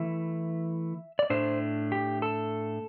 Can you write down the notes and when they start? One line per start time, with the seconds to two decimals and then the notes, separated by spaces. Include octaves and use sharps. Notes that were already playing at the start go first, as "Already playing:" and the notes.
Already playing: E3 A3 E4 E5
1.19 D5
1.30 A2 A3 D4 C5
1.92 G4
2.22 A4